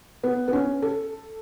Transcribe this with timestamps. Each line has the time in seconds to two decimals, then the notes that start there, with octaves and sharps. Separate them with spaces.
0.23 B3
0.48 B3
0.53 C#4
0.82 A4